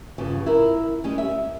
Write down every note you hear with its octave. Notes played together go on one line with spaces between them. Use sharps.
E2 G2 C#3 F3
E4 A#4
G3 G#3 C#4
E5